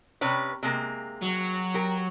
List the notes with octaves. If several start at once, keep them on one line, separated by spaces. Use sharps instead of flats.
C3 C#4 B4
C3 G#3 A#3
F#3
G4 A#4